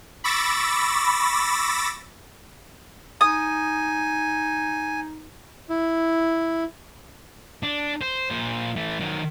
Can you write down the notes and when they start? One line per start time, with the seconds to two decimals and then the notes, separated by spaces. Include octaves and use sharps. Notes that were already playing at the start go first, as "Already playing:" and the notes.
0.24 B5 C#6 D6 E6 A6 A#6
3.21 D#4 G#5 D#6
5.70 E4
7.63 D4
8.01 C5
8.30 A#2 C5
8.76 E3 A3
9.00 D#3 F#3